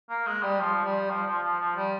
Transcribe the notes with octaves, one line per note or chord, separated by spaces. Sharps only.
A#3
G#3
G3
F3
G3
F3
F3
F3
F3
G3